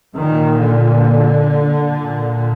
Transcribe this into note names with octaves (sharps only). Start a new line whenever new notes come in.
A#2 D#3
D3
A#2